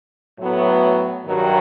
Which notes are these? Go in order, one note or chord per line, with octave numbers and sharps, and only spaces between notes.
A2 F#3 B3
G2 D#3 F#3